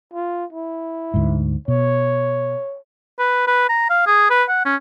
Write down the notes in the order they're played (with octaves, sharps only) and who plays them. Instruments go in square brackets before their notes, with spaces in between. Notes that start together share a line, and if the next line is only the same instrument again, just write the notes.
[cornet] F4
E4
[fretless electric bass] D2 G#2
[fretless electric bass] B2 [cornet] C#5
[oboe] B4
B4
A#5
F5
G#4
B4
F#5
C#4